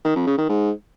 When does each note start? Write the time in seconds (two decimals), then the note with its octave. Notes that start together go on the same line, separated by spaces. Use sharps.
0.05 D#3
0.16 F2
0.27 C#3
0.38 D#3
0.49 G#2